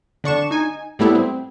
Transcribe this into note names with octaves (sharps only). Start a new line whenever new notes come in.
D3 D4 C#6 E7
D#4 G#5
A2 G3 A3 B3 E4
C4